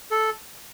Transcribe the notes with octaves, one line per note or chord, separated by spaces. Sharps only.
A4